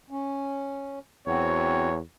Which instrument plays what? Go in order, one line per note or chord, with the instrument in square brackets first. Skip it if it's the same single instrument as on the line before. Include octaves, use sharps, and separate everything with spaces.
[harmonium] C#4
[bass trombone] E2 [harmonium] C4 F#4 [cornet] C#5